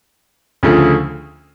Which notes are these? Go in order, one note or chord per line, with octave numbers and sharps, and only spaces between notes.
D2 C#3 F3 A3